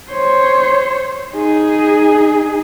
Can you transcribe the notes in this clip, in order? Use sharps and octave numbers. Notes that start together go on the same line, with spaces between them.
C5 C#5
D#4 G#4